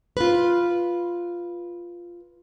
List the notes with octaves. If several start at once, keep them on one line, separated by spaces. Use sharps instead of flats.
F4 B4